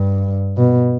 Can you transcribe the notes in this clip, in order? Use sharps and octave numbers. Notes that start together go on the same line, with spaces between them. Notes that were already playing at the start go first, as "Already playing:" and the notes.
Already playing: G2
B2